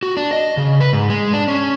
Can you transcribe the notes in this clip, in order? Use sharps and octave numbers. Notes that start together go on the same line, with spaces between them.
F#4
D4
D#5
C#3
B4
G#2
G#3
D4
C#4